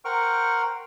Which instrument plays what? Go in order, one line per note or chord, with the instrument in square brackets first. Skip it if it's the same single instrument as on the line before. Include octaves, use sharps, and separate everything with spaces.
[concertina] A#4 C5 F#5 G5 C#6 F6